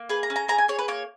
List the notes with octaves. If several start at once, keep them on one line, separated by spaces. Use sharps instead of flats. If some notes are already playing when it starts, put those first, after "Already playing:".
Already playing: A#3
G#4 B4
A#5
C#4
A#5
G#4 A#5
G#5
G#4 C#5
B4
A#3 C#5